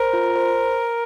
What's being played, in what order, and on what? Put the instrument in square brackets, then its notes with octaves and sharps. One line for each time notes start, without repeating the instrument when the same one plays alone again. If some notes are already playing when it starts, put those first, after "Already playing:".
Already playing: [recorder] A#4 [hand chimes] C5
[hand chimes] F4
C5